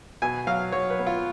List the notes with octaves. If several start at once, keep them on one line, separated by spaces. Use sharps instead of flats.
B2 G#5
F#3 F5
F#3 C#5
B4
B3
F4